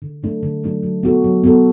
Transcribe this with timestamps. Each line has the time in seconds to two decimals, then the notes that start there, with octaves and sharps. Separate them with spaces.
0.02 D3
0.23 F#3 A3 D4
0.43 D3
0.63 F#3 A3 D4
0.83 F#3
1.03 B3 F#4 A4
1.24 F#3
1.44 B3 F#4 A4